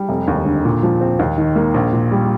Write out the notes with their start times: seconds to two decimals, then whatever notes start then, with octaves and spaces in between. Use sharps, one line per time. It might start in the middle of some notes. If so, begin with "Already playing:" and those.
Already playing: G3
0.09 F1
0.28 D#2
0.45 D3
0.65 A#2
0.83 F3
1.01 C4
1.19 D#2
1.38 D#3
1.56 A#3
1.74 A#1
1.93 A#2
2.11 G3